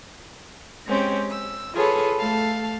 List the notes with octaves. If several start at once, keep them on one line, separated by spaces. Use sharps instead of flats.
G#3 C4 C#4 G4
E6
F4 G#4 A4 B4 C#5
A3 A4 F5 A5